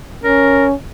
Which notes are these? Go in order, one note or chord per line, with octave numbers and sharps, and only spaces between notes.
C#4 A#4